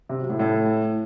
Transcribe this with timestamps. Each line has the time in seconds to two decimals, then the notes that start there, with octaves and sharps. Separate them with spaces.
0.09 C3
0.19 F#3
0.30 A2
0.40 A2